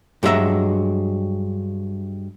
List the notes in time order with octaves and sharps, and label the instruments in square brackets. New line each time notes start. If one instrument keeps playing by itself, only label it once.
[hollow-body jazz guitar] G2 F#3 G#3 E4 E5 A#5